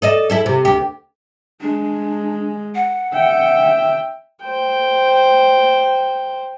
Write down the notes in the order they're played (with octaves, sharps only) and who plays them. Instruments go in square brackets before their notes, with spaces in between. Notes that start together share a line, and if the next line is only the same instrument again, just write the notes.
[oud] A4 D5 D#5
E4 G#4 A4
C3
D2 G4
[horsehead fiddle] G#3 [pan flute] D4
[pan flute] F#5
[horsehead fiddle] E5 G5
[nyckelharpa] C5 G5